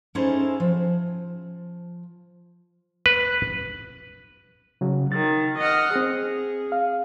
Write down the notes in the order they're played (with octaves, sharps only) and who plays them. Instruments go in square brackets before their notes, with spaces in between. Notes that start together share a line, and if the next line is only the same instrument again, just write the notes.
[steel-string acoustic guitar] C#4 D#4 E4 G#4 A4 C5
F3
[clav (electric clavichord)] B4
[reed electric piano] C#3 F#3
[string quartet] D#3 [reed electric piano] A6
[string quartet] D#5 F#5 F6
[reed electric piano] C4 [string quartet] G#4
[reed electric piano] F5